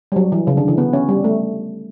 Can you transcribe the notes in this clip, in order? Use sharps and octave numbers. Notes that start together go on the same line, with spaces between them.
G3
F#3
E3
C#3
D3
E3
B3
C#4
G3
A3